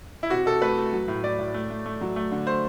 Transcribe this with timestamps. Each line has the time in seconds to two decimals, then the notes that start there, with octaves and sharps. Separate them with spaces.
0.23 E4
0.30 C3 F#4
0.46 C3 A4
0.62 A3 B4
0.78 A3
0.93 F#3
1.08 A2
1.24 A2 D5
1.39 A2
1.54 A3
1.70 A3
1.86 A3
2.01 F#3
2.16 A3
2.32 D3
2.47 A3 C5